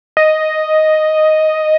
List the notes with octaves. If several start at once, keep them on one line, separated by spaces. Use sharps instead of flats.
D#5